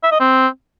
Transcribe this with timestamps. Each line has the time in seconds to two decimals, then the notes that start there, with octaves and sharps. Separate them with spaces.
0.03 E5
0.11 D#5
0.20 C4